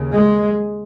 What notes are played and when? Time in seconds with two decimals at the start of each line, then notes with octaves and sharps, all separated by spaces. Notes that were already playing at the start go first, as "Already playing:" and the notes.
Already playing: D#2 C#3
0.13 G#3